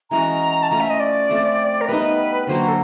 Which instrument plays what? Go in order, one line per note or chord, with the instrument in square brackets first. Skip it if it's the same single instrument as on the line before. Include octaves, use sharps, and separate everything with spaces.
[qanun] E3 G#3 C#4 F#4 [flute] A#5
[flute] A5
[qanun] F3 A3 C#4 [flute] A#5
[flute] E5
D#5
D5
[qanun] F3 A3 C4
[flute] A#4
[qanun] G3 B3 D#4 [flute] B4
[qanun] D3 F#3 A#3 [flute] C5
[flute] A4